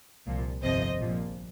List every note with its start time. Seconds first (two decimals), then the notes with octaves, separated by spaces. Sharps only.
0.26 C2 A#2 F3
0.62 G1 F2 C3 F3 C5 D#5
0.98 A#1 A#2 F3